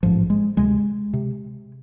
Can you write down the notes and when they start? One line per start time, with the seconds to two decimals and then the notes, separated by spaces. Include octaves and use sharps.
0.03 A1 G#2 F3
0.30 G#3
0.57 D2 C3 G#3
1.13 C3